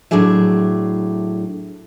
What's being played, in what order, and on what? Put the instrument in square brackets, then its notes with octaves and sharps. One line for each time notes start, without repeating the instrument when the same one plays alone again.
[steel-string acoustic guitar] A2 F#3 D4 G#4 E5